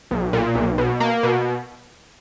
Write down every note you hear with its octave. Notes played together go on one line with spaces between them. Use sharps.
B1
A#2
B1
B2
A#3
B2